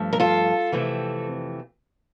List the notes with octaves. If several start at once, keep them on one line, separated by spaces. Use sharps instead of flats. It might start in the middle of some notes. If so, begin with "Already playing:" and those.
Already playing: G2 F3 A3
A#4
F4 A4
F2 C3 E3 A3 C4